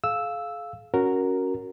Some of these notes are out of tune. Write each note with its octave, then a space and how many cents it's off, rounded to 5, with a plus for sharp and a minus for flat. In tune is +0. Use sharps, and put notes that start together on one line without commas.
G#4 +45 F5 +0 E6 +0
C#4 +0 F#4 +0 A#4 -5